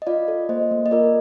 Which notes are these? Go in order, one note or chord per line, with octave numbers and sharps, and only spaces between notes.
D#5
F4 D5 F5
A4
A#3 C5 D#5
A#3
D#5
F4 A#4 D5